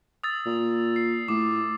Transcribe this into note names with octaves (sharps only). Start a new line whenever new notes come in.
D#6 E6 A6
A#2
C7
A2 D6